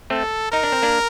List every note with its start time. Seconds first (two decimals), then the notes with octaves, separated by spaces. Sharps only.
0.10 A3 C4 A4
0.52 D#4 A#4
0.63 D4
0.72 C4
0.82 A#3 D4